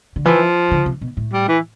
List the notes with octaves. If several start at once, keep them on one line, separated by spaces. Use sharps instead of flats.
D3
E3 F3
D3
C3
B2
A2
G3
E3